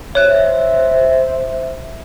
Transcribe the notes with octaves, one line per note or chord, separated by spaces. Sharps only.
C5 C#5 E5 F#6